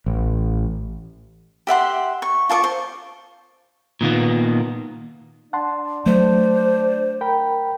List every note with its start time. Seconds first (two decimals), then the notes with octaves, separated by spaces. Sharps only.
0.06 A1
1.67 G4 E5 F#5 C6
2.22 C#6
2.49 F4 A5 C#6 D6
2.64 C5
4.01 A#2 D#3 A#3 B3
5.53 D4 F#5 A5 C6
6.06 F#3 A3 C5
7.21 A#4 G5 B5